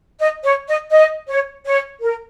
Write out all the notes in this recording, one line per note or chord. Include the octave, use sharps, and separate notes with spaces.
D#5
C#5
D#5
D#5
C#5
C#5
A#4